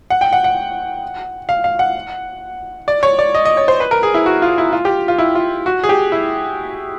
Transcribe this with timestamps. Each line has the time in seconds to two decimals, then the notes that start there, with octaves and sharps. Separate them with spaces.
0.10 F#5
0.21 G5
0.33 F#5
0.44 F#5
1.49 F5
1.64 F5
1.79 F#5
2.88 D5
3.03 C#5
3.19 D5
3.35 D#5
3.45 D#5
3.57 C#5
3.68 C5
3.80 B4
3.91 A#4
4.03 G#4
4.14 E4
4.26 F#4
4.42 F4
4.58 E4
4.72 F4
4.85 G4
5.08 F4
5.19 E4
5.35 F4
5.66 F#4
5.84 G#4
5.89 G4
6.12 E4